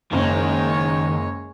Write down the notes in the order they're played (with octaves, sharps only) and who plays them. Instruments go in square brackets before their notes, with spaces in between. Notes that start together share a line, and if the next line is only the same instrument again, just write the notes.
[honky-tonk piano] F#1 [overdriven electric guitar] D#3 [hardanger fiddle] G#3 C#5